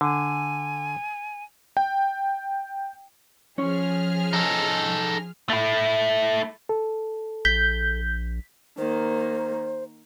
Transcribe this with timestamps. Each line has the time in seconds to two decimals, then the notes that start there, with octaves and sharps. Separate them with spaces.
0.01 D3 G#5
1.77 G5
3.58 F3 C#4 G#4 F6
4.33 D#4 A4
5.49 A3 E4
6.69 A4
7.45 A#1 G6 B6
8.78 D#3 A#3 C5